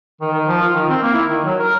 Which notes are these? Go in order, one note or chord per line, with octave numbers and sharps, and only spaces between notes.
D#3
D#3
F3
F4
D#3
C4
A#3
E4
D#3
F#3
A#4